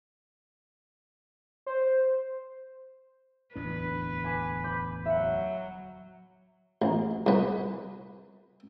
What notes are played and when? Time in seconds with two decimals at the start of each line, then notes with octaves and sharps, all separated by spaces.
1.66 C5
3.56 D1 E2 D4 B4
4.24 G#5 D6 E7
4.64 B5 D6 G6
5.06 F#3 E5 F#5
6.82 A1
7.26 C2 B4